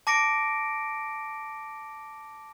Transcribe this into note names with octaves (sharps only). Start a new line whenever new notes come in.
A5 D6 A#6 C#7 D7